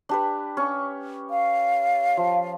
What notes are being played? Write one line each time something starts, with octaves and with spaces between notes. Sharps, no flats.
D4 G4 B4
C#4 C#6
F5
F3